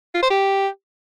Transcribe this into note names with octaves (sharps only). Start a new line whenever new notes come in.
F4
C5
G4